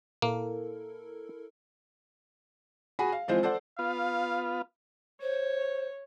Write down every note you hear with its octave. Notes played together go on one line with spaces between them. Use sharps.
A#2 A#3 E4 A4 A#4
F#4 G#4 F#5 G#5 B5
F5
E3 F3 G#3 C4 F4 C5
A4 C5 D5 F#5
B3 F4 F5
C5 C#5